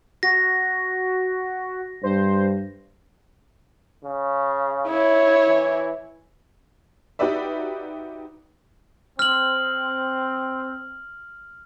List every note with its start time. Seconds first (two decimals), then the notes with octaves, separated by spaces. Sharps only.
0.23 F#4 A#6
2.03 G2 C5
4.05 C#3
4.87 E4 C#5
5.48 E3
7.19 D#4 F#4 G4 B4 D5 E5
9.19 C4 F6 F#7